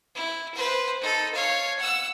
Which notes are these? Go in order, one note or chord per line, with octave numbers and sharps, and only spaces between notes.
E4
B4 C5
D#4 A4
C#5 F5
F#5 E6